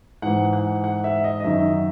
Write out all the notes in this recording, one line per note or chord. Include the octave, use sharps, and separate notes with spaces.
G#2 E3 F#5
F#5
F#5
E5
D#5
D#5
F#2 D#3 E5